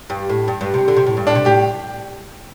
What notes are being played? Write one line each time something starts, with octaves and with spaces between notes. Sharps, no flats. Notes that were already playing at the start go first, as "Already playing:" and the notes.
G2
A2
G2
G2
C3
D3
C3
A2
G2
A2 D4
C3
A2 G4